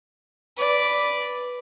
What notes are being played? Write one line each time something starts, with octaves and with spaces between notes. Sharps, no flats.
B4 D5